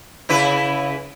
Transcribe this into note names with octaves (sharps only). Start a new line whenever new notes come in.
C#3 E4 B4